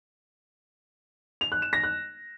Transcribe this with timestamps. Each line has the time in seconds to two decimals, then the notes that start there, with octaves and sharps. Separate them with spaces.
1.41 F7
1.52 F#6
1.62 E7
1.73 A#6
1.83 F#6